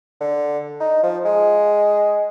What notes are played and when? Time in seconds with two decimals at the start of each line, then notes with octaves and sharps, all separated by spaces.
0.21 D3
0.80 D#4
1.03 F3
1.25 G#3